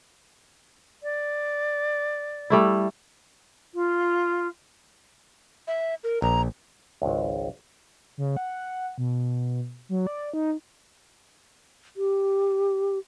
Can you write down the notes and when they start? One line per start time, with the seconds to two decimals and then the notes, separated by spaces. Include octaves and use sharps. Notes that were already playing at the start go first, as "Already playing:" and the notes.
1.03 D5
2.50 G3 A3 E4
3.74 F4
5.68 E5
6.04 A#4
6.22 A#1 A#5
7.02 G#1 C#2
8.17 C#3
8.37 F#5
8.98 B2
9.89 F#3
10.07 D5
10.33 D#4
11.97 G4